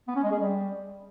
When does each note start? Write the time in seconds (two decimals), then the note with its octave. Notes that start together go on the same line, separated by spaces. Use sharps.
0.08 B3
0.16 C#4
0.23 G#3
0.31 G#4
0.39 G3